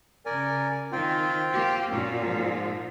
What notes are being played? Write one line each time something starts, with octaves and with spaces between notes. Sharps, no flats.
C#3 A#4 D5 G#5
D#3 C4 F4 G5
A#3 G4
A#2 F#3 C#4 F4
G#2 F3